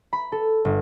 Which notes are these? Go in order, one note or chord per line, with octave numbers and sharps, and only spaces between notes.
B5
A4
G1